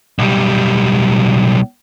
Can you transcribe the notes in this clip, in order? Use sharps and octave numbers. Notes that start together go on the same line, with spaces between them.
B1 G3